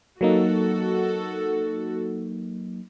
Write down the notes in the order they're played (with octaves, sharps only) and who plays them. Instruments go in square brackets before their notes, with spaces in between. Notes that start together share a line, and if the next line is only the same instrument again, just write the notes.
[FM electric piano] F#3 A#3 D#4 [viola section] F#4 A4